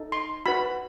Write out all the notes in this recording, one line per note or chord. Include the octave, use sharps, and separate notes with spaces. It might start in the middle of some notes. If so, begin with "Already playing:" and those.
Already playing: D#4 A4
C6
F#4 B4 B5